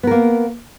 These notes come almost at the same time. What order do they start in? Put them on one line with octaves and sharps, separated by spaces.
B3 A#4 A#3